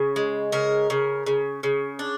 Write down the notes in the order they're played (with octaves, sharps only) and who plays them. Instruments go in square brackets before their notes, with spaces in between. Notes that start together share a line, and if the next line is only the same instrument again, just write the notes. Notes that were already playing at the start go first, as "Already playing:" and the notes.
Already playing: [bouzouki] C#3
G#3
C#3 A#4
C#3
C#3
C#3
D4